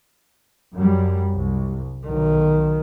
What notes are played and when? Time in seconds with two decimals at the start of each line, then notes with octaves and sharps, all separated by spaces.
0.74 F#2 G3
1.32 C2
2.07 B1 D#3